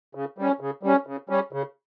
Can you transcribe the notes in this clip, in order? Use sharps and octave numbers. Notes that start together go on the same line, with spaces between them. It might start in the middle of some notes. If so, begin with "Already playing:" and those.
C#3
G3 C#4
C#3
G3 C#4
C#3
G3 C#4
C#3